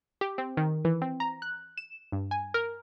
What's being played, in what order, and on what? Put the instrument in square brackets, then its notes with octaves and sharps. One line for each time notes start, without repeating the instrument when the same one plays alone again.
[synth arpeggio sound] G4
C4
D#3
E3
C4
A#5
F#6
E7
G2
G#5
A#4